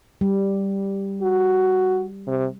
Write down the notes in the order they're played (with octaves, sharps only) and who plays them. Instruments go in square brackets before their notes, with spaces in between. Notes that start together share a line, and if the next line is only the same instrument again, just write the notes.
[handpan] G3
[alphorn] F#4
C3